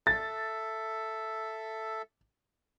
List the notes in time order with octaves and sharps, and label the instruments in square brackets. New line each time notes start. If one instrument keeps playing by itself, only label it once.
[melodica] A4 E5 [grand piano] A6